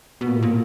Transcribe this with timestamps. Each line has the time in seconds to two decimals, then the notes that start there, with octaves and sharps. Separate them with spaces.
0.21 B2
0.28 A#2
0.36 A2
0.42 A#2